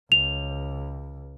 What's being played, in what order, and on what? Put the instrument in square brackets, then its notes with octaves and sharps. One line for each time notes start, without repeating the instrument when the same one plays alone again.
[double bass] C#2 [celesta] F7